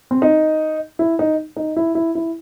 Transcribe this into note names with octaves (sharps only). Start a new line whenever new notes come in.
C4
D#4
E4
D#4
D#4
E4
E4
E4